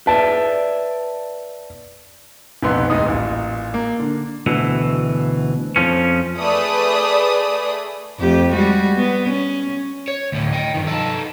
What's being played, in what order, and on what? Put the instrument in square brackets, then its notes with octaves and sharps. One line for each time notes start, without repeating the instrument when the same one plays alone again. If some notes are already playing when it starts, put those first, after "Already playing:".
[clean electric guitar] B4 D5 E5 [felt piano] A5
[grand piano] F1 B1 F2 B3 C6
D1 G#2 D#4 D#6
A1 A#2
A#3
D3
[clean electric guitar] D2 B2 E3
F2 F3 C#4
[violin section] A3 G#4 B4 D5 D#6
[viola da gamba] F2 A3 G4
G3 G#3 F#4
B3
C#4
[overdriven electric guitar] C#5
D2 A2
D#5 G5
G2 D#3
D#4 A4